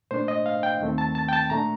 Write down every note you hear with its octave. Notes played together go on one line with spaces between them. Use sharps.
A#2 A3 D4 C5
D#5
F5
G5
D#2 D#3 A3 C4
A5
A5
G5
A5
A#2 A3 D4 A#5